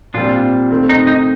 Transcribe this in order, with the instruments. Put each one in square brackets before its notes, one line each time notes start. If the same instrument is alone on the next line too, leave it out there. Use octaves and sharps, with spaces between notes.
[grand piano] A#2 G3 C4 [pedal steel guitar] D4 F4
[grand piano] D#3 A3 C4
[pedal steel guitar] D#4
D#4